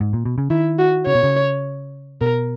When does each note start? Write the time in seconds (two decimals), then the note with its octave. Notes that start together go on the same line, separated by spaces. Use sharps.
0.01 G#2
0.13 A#2
0.25 B2
0.38 C#3
0.50 D#3 E4
0.79 F#4
1.07 C#3 C#5
1.15 B2
1.24 C#3
2.21 B2 A#4